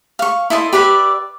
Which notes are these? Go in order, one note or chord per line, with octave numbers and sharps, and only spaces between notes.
F5 C#6
E4 A4 D#5 C6
G4 B4 D5 E5